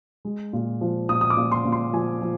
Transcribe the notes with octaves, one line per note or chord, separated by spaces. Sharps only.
G#3
A#2
F3
A#2 D#6
D#6
D6
A#2
C6
A#2
C6
F3 G#5
F3